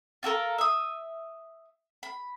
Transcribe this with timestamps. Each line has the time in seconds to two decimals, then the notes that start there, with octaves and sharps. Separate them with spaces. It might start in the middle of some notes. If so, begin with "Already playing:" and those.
0.23 F4 F#4 A4 A#4
0.58 E5 D#6
2.03 B5